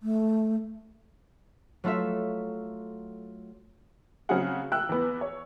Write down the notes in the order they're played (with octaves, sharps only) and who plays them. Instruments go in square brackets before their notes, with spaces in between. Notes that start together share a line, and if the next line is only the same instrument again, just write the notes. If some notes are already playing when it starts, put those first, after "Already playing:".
[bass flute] A3
[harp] F#3 A3 F4 A4 E5
[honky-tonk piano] C#3 F#3 C4 G#4 F#5
G5 E6 F#6
E2 B3
C#5